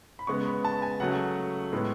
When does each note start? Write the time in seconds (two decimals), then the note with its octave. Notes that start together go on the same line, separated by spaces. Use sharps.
0.19 B5
0.27 C#3 G#3 B3 C#6
0.46 B5
0.65 A5
0.82 G#5
1.00 C#3 F#3 A3 F#5
1.72 A2 G#3 B3